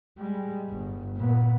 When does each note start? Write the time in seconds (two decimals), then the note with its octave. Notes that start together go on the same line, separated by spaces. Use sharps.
0.18 G3 G#3
0.70 G1
1.17 A#2 B3